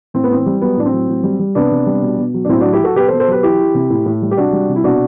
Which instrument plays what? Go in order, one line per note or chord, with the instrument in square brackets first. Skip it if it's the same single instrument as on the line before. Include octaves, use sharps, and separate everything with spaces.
[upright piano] A2 C4
B3
E3 C4
G3
F#3 B3
A2 D4
C4
F#3
A2
G3
G3
C3 B3 D4
C3
G3
B2
B2
F#3
D4
A2 C4 E4
D4 F#4
F#3
E4 G4
F#3 F#4 A4
B2 G4 B4
A4 C5
B2
A4 C5
F#3 G4 B4
E3 E4 G4
E3
C3
A2
A2
G3
G4
C3 D4 F#4
G3
C3
E4
B2 D4 F#4